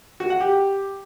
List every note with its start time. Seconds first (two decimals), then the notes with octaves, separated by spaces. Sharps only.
0.20 F#4
0.30 F#5
0.40 G4